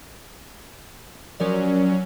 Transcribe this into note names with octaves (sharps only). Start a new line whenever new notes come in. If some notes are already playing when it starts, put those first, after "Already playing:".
F3 F#3 C#4 A#4 D5